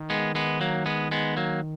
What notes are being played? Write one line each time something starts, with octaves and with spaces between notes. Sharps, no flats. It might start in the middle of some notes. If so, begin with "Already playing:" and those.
Already playing: D#3
G#3 B3
G#3 B3
F#3 A#3
G#3 B3
G#3 B3
F#3 A#3